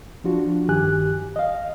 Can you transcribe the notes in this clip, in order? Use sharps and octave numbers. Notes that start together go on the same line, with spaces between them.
F3 D4 F4 F#4
G2 D#3 G4 G#5 F#6
D#5 F5